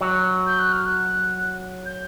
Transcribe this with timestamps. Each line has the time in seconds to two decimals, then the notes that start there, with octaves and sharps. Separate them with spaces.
0.01 F#3
0.46 G6
0.59 F#6
0.73 F6
0.86 F#6
1.86 G6